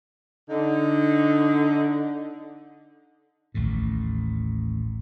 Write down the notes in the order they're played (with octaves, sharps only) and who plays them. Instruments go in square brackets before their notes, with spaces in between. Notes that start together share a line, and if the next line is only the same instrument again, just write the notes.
[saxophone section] D3 D#4
[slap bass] A1 D#2 A2